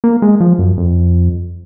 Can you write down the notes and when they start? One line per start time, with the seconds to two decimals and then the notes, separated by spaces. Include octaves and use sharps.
0.04 A#3
0.22 G#3
0.40 F3
0.59 F#2
0.77 F2